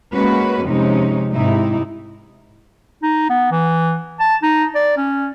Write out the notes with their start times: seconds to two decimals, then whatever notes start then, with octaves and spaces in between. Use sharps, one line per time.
0.13 G#3 A#3 C#4 F#4 B4
0.66 F2 C3 G#3 C#4 D#4
1.34 G#2 C3 D#4 E4
3.03 D#4
3.30 B3
3.52 E3
4.20 A5
4.43 D#4
4.75 D5
4.97 C#4